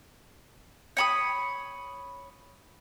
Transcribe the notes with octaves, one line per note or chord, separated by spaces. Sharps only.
C#5 B5 D#6